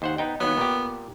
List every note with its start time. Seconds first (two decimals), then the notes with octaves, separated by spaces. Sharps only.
0.02 D#2 C5 F#5
0.18 B3 D#4 G5
0.40 D#2 F#3 B3
0.58 A#2 G4